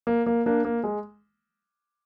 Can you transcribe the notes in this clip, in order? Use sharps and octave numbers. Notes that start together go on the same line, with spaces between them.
A#3
A#3
A#3 D4
A#3
G#3